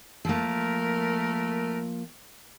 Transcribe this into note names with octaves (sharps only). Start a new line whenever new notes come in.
F3 A3 A#3 A#4